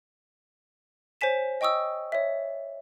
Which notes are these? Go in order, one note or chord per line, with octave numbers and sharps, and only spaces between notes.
C5 C#5 G#5 B6 E7
D#5 G5 C#6 D#6 E6
C#5 E5